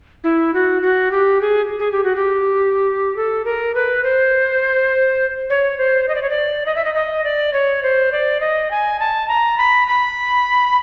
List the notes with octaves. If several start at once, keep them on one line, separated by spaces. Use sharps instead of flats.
E4
F#4
F#4
G4
G#4
G#4
G4
F#4
G4
A4
A#4
B4
C5
C#5
C5
D#5
D5
C#5
D5
D#5
E5
D#5
D#5
D5
C#5
C5
D5
D#5
G#5
A5
A#5
B5
B5